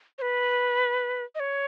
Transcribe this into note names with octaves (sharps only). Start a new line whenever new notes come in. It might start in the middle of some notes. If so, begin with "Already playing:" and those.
C#5
B4
D#5
C#5